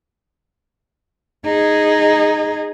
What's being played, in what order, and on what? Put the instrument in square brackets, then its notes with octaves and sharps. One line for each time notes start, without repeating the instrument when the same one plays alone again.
[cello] D#4 G#4